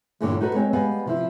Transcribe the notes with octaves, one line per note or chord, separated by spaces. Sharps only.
E2 G2 A#2 D3 G3 C#5
D#4 F#4 A4 B4
G#3 C4 C#5
G3 G#3 B3 F5 G#5
C3 F3 E4